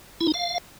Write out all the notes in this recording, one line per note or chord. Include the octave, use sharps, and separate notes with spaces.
E4
D#4
F5